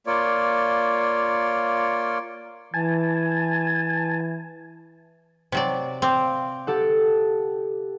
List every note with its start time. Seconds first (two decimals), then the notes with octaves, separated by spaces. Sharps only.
0.07 A#3 F4 C#5 D5
2.74 E3 G#5 A5
5.52 C3 F#3 D5
6.02 C4 F5 D6
6.67 G4 A4 F#5